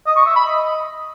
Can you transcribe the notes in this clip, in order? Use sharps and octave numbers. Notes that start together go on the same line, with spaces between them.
D#5
C#6
E5
B5
D#5